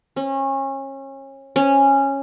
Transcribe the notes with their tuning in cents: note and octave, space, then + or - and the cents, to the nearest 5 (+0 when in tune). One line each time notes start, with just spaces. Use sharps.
C#4 -30
C#4 -10